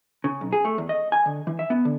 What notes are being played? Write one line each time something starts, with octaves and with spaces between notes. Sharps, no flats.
C#3
B1
G#4
A3
E2
D#5
G#5
D3
E3
E5
B3
D3